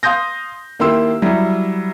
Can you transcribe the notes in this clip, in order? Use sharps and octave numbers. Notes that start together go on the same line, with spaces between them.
F5 C6 D#6 G6 A#6
D#3 A#3 E4 G4 C6 E6
F#3 G3 E4